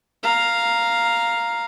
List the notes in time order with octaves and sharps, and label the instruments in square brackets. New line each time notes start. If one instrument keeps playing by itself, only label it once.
[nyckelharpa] F5 A#5